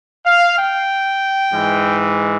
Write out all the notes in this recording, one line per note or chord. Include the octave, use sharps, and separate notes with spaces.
F5
G5
G#2 E3 G#3